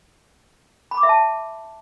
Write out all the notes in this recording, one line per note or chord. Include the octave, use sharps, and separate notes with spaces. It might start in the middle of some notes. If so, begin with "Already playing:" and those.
B5
D6
E5
A5